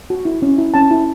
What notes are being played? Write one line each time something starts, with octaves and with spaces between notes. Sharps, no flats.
F#4
E4
C#4
E4
C#4 A5
E4